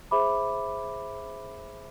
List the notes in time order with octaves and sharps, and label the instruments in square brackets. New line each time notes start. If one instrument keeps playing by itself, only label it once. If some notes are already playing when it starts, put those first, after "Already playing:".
[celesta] G#4 C5 E5 B5 D6